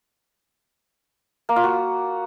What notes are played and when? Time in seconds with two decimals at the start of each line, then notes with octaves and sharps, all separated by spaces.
1.49 A#3
1.56 F4
1.64 F#4